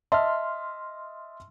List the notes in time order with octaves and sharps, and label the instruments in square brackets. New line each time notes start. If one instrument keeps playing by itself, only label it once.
[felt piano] D#5 E5 A5 [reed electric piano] C6 F6